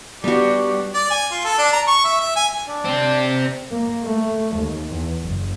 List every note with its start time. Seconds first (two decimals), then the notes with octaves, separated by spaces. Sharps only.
0.24 G3 B3 D4 F#4 G4
0.94 D5
1.10 G#5
1.31 F4
1.44 A4
1.58 D4
1.73 A#5
1.87 C#6
2.04 E5
2.20 E5
2.36 G#5
2.68 D4 D5
2.85 C4 G4
3.33 D5 A#5
3.71 A#3
4.04 A3
4.57 D#2
4.93 E2
5.25 F#1